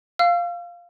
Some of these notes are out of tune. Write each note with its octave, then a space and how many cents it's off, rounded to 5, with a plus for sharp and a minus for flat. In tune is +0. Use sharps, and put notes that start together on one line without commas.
F5 +0 E6 +45